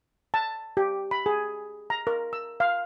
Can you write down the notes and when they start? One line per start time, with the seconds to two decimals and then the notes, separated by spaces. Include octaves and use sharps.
0.34 A5
0.77 G4
1.11 B5
1.26 G#4
1.90 A#5
2.07 A#4
2.33 E6
2.60 F5